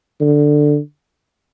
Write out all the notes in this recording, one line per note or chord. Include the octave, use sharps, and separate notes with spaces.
D3